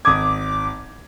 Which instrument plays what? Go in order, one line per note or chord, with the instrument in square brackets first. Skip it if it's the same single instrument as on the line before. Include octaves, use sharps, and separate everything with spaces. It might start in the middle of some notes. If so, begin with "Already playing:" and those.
[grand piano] G#1 D#6 G#6 [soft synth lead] D6